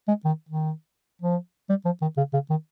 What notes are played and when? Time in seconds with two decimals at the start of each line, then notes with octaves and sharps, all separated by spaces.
0.08 G#3
0.25 D#3
0.49 D#3
1.22 F3
1.69 G3
1.85 F3
2.02 D#3
2.17 C#3
2.33 C#3
2.50 D#3